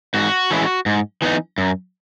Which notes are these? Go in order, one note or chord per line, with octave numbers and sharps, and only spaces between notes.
G#2 F#4
E3 G#3 C#4 E4
G#2
E3 B3 D#4
F#2